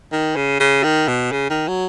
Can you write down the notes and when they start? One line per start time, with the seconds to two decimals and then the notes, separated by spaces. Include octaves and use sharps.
0.12 D#3
0.36 C#3
0.60 C#3
0.84 D#3
1.08 B2
1.32 C#3
1.50 D#3
1.68 F#3